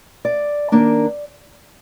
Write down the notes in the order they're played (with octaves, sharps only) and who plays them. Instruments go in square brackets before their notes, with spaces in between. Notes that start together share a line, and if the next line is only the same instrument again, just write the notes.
[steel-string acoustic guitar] D5
D#3 A#3 D4